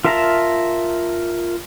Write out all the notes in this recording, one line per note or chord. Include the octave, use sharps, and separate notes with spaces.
F4 A#4 E5 A5 A#5